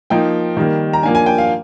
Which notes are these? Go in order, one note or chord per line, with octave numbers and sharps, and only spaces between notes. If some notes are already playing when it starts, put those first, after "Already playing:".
F3 A#3 D#4 G5
D#3 G3 A#3
A#5
F3 A#3 D4 G#5
G#5
G5
F5